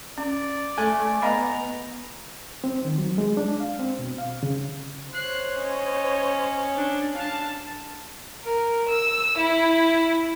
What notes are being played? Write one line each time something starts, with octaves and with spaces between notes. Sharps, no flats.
C#4 D5
A3 A4 G#5
B3 D#5 F5 A#5 B5
C4
D#3
F#3
G#3
D4
F5
C4
B2
F5
C#3
C5 C#5 F#6 C7
C#4 D#5
D4
D4 F5 A5
A#4
E6
E4